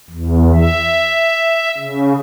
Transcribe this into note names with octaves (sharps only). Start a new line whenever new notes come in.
E2
E5
C#3